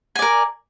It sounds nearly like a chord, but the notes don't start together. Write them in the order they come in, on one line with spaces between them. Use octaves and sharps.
G#5 D5 A#4